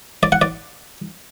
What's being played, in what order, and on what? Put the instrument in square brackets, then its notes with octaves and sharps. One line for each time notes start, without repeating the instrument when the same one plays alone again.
[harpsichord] D5
F#5
D5